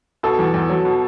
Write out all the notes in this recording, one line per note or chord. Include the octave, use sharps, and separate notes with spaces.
B2 A4
E2
E2
F#3
B2